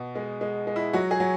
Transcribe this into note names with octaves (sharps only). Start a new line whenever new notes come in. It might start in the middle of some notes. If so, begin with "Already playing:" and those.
Already playing: B2
G#3
G#3
G#3
E4
F#3 F#4
G#4
F#3